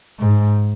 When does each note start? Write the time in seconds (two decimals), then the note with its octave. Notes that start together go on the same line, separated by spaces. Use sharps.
0.19 G#2